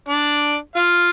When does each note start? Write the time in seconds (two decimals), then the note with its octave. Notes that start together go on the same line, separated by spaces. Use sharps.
0.09 D4 D5
0.76 F4 F5